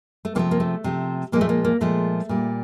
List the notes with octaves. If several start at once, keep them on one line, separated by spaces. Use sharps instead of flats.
A3
C3 F3 A3 A#3
A#3
A3
C3 F3 A3
A#2 F3 G#3 A#3
A3
A#3
A#3
A#2 F3 G#3 A3
A#2 G3